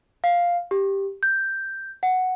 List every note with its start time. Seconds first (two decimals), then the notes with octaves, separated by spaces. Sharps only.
0.24 F5
0.71 G4
1.23 G6
2.03 F#5